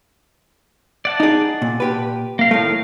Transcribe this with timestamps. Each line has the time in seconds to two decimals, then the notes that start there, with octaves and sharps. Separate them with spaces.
1.05 D5 F#5 A5
1.20 D#4 G#4
1.62 A#2
1.80 A#2 G4 B4
2.39 A#3 F5
2.51 A2 D#3 A3 A#4 F5